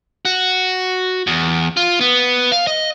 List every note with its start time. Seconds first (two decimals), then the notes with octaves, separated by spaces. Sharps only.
0.25 F#4
1.27 E2
1.77 F4
2.01 B3
2.52 F5
2.67 D#5